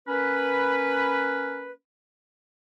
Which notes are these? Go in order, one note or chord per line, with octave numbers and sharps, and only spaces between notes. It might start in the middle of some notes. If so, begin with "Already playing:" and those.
A#3 C#4 B4